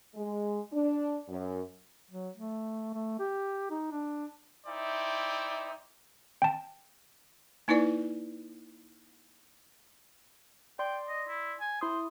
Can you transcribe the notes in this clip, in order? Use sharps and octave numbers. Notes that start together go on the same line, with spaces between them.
G#3
D4
F#2
F#3
A3
A3
G4
D#4
D4
D#4 E4 C5 D5 E5 G5
G5 A5
A#3 D#4 E4 B4 D5
D5 G5 C6
D#5
E4
G#5
E4 C5 D#6